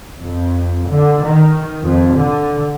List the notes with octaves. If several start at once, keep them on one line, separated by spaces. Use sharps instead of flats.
F2
D3
D#3
F2
D3